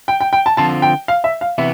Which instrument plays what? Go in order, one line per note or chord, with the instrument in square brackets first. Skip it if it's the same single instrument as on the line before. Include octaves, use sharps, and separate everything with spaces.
[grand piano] G5
G5
G5
A5
[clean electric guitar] D3 F3 C4 F4 [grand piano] A5
[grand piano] G5
F5
E5
F5
[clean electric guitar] C3 E3 B3 [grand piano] E5